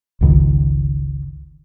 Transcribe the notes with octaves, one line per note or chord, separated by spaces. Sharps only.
G1 C#2 D#3